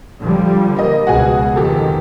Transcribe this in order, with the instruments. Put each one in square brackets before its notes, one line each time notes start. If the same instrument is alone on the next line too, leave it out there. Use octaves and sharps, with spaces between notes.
[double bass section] D3 F3 G3
[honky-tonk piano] A#3 D#5
[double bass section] C#2 B2 [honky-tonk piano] F#4 G#4 G#5
[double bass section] F2 C3 D#3 [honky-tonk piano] G4 A4